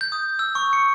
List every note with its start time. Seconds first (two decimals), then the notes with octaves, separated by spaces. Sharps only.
0.01 G6
0.12 D#6
0.39 E6
0.55 C#6
0.73 C#7